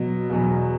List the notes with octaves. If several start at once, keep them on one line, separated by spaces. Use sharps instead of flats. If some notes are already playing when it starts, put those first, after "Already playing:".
Already playing: B2 F#3
E2 B2 F#3